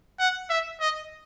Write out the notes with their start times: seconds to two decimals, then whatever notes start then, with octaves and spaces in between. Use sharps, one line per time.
0.20 F#5
0.50 E5
0.81 D#5